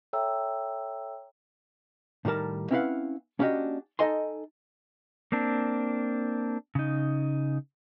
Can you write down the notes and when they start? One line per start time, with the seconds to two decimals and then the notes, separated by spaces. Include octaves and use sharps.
0.13 A4 C#5 E5 G5 A#5 E6
2.25 A2 D#3 G3 A#4 A5
2.71 C4 C#4 E4 B4 F5 F#5
3.39 A#3 C#4 D4 F#4 G4 D#5
3.99 D#4 E4 A4 D#5 G#5 C6
5.32 A#3 C4 D4
6.75 C#3 D#4